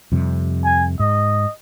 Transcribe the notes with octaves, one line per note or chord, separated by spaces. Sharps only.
F2 C3 G3
G#5
G#2 D#5